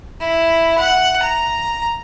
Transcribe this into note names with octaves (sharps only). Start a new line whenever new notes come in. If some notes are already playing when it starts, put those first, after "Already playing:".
E4
F#5
A#5